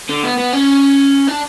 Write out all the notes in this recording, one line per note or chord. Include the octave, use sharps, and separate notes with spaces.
D3
B3
B3
C#4
D4